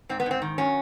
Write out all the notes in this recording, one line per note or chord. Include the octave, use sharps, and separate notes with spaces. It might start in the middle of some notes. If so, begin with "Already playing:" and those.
G#2 C4
B3
G#2 C4
D#3
F#3 C#4